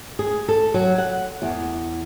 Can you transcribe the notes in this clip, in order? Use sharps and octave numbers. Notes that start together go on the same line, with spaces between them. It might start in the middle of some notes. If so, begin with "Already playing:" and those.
G#4
A4
F#3
F#5
E2